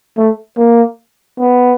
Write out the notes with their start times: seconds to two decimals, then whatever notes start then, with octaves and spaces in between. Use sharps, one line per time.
0.17 A3
0.58 A#3
1.39 B3